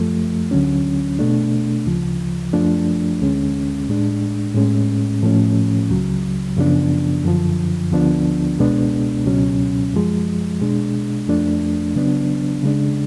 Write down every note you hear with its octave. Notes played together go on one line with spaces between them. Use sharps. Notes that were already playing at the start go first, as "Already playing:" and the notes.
Already playing: F#2 F3 A3
D2 D3 F#3 C#4
B2 A3 D4
D2 C#3 F3
F#2 F3 A3 D4
D2 D3 G#3 C#4
A2 G#3 D4
A2 G#3 C#4
A2 F3 A3 C#4
C#2 C#3 F#3
F#2 C#3 F3 B3 D4
F#2 D3 F3
D2 D3 F3 B3 D4
C#2 B2 G#3 B3 D4
C#2 B2 F#3 C#4
F#2 F3 G#3
B2 G#3 D4
F2 F3 A3 D4
C#3 F#3 B3 D4
C#3 G#3 D4